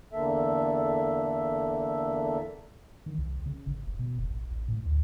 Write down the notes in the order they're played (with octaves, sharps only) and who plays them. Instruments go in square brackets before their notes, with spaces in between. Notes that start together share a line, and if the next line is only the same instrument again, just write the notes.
[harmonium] E2 D3 A#3 A4 E5
[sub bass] D#3
C2
C#3
G#1
G1
B2
F1
A1
A1
A2
D2